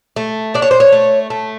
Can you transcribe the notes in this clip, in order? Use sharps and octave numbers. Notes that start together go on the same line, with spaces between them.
A3
D4 D5
C#5
C5
C#5
A3
A3